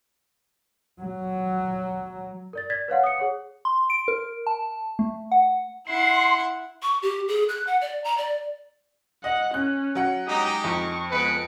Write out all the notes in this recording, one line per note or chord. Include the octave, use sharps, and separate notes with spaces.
F#3
A#4 D5 A6
D5 G#6 A6 B6
B4 C#5 F5 F#5
D#6 C#7
G#4 C#5 F#5
C6
D7
A#4
A5
A3
F#5
E4 F#5 C6
C#6
G4
G#4
F#6
F#5
D5
A#5
D5
D#5 F#5
C#4 F#6
F#3 F#5
G#3 D#4 G4 A#5 D#6
F2 C#6
G#3 B3 B4 C#7 D7